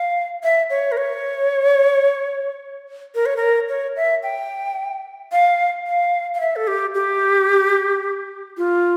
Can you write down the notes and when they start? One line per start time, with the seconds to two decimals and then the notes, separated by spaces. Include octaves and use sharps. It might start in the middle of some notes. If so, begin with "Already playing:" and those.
Already playing: F5
0.44 E5
0.70 C#5
0.92 A#4
0.97 C#5
3.15 A#4
3.26 C#5
3.37 A#4
3.69 C#5
3.96 E5
4.23 G5
5.32 F5
5.86 F5
6.35 F5
6.40 E5
6.56 A4
6.67 G4
6.94 G4
8.57 F4